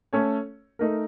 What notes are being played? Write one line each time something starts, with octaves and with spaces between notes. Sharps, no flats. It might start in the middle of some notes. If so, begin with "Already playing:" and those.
A3 C#4 A4 C#5
A3 D#4 A#4